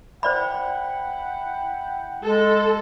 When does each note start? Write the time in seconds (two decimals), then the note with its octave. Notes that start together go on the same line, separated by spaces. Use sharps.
0.23 E4 C5 D5 F#5 G5 B5
2.24 G#3 A4